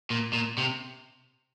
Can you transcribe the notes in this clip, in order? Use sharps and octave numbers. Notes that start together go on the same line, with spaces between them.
A#2
A#2
C3